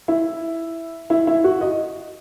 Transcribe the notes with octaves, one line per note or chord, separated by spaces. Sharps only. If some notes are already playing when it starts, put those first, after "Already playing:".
E4
E4
E4
F#4
D#5